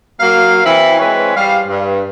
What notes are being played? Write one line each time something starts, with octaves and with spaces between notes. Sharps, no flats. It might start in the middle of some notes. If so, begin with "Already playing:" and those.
F#3 A#3 F5
E3 C4 E4
E3 G#3 C4 B4 C#5
G3 F5
G2